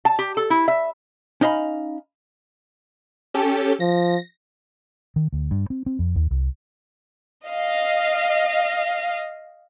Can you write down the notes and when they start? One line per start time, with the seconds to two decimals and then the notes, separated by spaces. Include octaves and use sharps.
0.05 A5
0.19 G4
0.37 A4
0.50 E4
0.68 E5
1.41 C#4 D#4 D#5 F5 B5
3.34 C#4 G4 A4
3.80 F3 A#6
5.16 D#3
5.33 D2
5.51 G2
5.70 C4
5.86 C4
5.99 F2
6.16 D#2
6.31 C2
7.48 D#5 F5